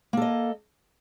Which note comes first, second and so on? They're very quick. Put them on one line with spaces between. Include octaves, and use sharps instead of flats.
A#3 A4 D#5